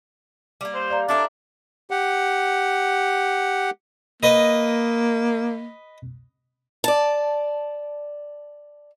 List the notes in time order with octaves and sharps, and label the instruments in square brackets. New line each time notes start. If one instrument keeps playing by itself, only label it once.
[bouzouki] G3 A#3
[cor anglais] C5
[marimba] D5 F5 A#5
[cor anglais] D4 [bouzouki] E4 A4 A#4
[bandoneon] G4 F#5
[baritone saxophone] A#3 [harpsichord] B4 D#5
[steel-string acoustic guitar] D5 A5